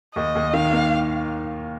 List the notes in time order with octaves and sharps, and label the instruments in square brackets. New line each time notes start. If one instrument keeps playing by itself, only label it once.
[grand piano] D#2 [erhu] D#5
[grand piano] D#2
[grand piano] D#3 [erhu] F5
[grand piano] A#3